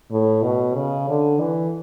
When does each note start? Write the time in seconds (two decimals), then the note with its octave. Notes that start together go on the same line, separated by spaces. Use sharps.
0.11 A2
0.43 B2
0.75 C#3
1.09 D3
1.40 E3